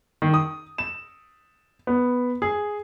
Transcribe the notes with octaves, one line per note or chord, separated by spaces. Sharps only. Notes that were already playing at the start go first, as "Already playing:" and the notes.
D#3
D#6
E7
B3
G#4